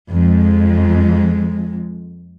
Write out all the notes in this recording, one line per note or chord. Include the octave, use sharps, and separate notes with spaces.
F2 G#3